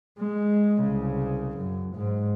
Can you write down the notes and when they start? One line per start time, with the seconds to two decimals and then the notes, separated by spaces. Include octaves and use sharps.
0.19 G#3
0.81 C2 C#3
1.57 F#2
1.96 G#2